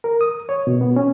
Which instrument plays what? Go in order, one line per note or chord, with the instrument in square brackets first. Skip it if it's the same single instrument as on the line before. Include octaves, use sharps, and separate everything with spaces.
[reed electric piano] A#4
D#6
C#5
B2
B3
C#4